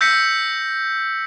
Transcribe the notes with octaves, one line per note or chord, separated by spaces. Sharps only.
E6 G6 A#6 B6 C#7